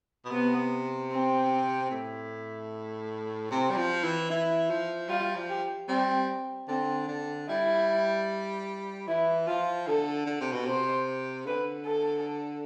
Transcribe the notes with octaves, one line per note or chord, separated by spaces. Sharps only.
B2
C3 B3
C4
A2
C3 C4
G3
F3
E3
E3 E4
F3
G3 F4
F3
G4
G3 C4
D3 C4
D3
G3 E4
E3 E4
F3 F4
D3 A4
D3
C3
B2
C3 C5
D3 B4
A4